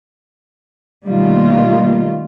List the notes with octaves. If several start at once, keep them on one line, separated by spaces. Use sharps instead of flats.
B2 D#3 G3 A3 A#3 F4